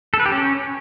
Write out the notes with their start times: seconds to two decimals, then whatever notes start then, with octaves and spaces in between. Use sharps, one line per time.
0.14 A4
0.20 B4
0.26 G4
0.32 C#4